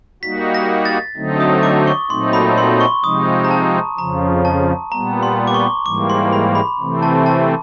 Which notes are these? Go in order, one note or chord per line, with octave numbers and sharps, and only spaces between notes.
G3 A#3 D#4 F#4 B6
A#6
A6
D3 F#3 A3 C4 D#4
D#6
D6
C#6
A#2 F#3 A3 C4 D#4 C6
B5
C6
C#6
C3 F3 G#3 C4 D#4 D#6
A#5
A5
F2 C#3 F3 A#5
A5
A#2 G3 B3 A#5
C6
D6
C#6
G#2 E3 G3 A#3 D6
C6
B5
B5
C3 E3 A3 C4
A5
A5